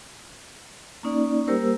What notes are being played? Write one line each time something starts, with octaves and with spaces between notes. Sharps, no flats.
A#3 C#4 D#4 D5
G3 A#3 G4 A#4 C5 E6